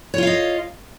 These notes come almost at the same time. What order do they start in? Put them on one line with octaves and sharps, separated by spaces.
C#5 F4 F5 D#5